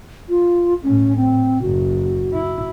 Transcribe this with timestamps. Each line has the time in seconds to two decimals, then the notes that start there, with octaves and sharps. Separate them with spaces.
0.29 F4
0.83 A2 C#4
1.16 C4
1.62 F#1 F#4
2.33 E4